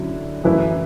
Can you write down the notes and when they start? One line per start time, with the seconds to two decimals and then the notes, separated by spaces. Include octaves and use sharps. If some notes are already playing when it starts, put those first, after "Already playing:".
Already playing: D3 F#3 C#4 E4
0.44 F#2 E3 A3 E4 B4